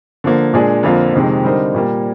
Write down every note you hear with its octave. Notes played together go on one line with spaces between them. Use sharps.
D3 F3 A#3
A#2 G#3 D4 G#4
F2 D3 F3 A#3 F4
F2 C3 D#3 G#3
D3 G3 C4 D#4 A#4
A#2 G3 A#3